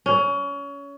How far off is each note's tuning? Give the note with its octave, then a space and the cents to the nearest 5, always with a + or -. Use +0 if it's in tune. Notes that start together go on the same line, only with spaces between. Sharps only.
C#4 +25